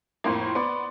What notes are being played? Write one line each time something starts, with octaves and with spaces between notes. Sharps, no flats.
F2 A2 A#3 A#5 C6 C#6
B3 D5 B5 C#6